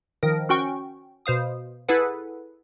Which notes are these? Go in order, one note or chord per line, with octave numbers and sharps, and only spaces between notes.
D#3 F3 A#4
C#4 F#4 G5 C#6
B2 C5 F5 D#6
E4 G#4 A4 B4 F#5